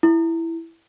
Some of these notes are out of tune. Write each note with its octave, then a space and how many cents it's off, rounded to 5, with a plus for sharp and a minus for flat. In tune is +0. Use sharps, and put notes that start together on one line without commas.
E4 +5